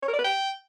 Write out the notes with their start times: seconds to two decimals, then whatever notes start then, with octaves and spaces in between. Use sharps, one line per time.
0.03 C#5
0.08 A#4
0.13 D5
0.19 B4
0.24 G5